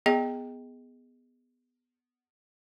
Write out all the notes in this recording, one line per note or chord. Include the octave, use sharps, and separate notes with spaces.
B3 G#4 D#5 G5